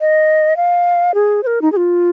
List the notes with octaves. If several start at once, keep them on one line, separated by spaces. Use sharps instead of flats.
D#5
F5
G#4
C5
A#4
D#4
G#4
F4